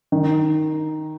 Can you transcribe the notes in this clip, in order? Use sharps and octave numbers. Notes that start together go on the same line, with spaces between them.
D#3